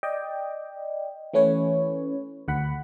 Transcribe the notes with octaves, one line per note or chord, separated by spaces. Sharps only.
D5 D#5 G5
E3 A3 C#4 B4 C#5
D2 F#5 B5